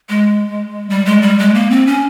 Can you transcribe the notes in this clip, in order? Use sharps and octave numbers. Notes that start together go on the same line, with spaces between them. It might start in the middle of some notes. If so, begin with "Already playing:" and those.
G#3
G3
G#3
G3
G#3
A#3
C4
C#4